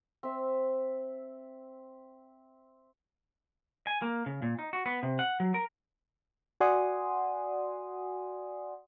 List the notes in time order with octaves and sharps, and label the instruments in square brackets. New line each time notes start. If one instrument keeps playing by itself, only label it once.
[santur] C4 E5
[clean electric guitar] G#5
A#3
C#3
A#2
D#4
F#4
B3
C3
F#5
F#3
A#4
[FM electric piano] F#4 D5 F#5 G#5 C6 D#6